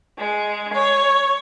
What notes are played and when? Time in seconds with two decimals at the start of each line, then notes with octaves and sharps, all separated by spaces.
0.19 G#3
0.74 C#5